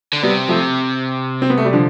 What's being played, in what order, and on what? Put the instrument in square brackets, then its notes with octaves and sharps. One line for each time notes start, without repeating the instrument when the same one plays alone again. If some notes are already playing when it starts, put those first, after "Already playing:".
[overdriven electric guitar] D3
[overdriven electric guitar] C3 [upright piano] G3 B3
[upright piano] F3 A3
C4
B3
A3
G3
D3 F3